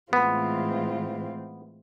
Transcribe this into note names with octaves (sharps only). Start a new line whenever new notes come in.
A2 E3 G#3 B3 C4 F4